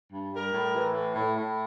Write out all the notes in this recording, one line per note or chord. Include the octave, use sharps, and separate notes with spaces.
G2
G3 A#4
A2
E3
A2
A2
A2